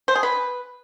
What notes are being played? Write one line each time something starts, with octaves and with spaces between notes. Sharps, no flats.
C5
G#4
B4